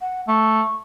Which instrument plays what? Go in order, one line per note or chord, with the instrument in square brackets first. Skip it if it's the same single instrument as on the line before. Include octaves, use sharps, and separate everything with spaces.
[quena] F#5
[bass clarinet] A3 [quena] C#6